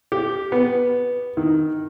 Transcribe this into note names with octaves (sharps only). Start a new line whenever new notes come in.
G4
B3
D#3